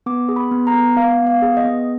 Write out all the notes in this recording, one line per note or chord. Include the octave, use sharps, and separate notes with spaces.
B3 D6
G#4
B5
B3
A#5
B3
B3 F5
B3
F5
G#4
D#5
B3